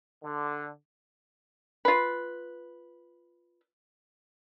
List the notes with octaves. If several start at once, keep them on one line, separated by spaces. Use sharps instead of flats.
D3
F4 B4